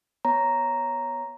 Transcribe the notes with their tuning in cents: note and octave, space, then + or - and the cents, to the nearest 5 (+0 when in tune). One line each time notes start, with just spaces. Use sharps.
B3 +0 C#5 +0 A#5 +0